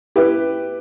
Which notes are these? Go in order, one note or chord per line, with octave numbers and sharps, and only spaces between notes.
E4 G4 B4